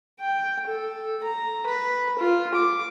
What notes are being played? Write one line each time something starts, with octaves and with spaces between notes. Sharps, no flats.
G5
A4
A#5
B4
F4
D6